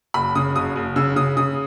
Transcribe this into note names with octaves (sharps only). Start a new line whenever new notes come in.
F#1 B5
C#3 D#6
F#1 D#6
F#1
C#3 E6
C#3 D#6
C#3 D#6